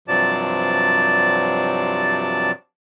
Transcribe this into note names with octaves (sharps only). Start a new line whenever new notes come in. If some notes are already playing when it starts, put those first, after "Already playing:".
G2 C3 F3 F#3 D5 A5